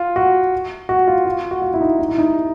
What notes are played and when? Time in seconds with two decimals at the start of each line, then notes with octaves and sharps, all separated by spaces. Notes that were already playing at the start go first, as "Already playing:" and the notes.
Already playing: F4
0.16 F#4
0.89 F#4
1.08 F4
1.25 F4
1.51 F#4
1.62 F4
1.74 E4
1.81 D#4
1.99 D#4
2.09 E4
2.18 D#4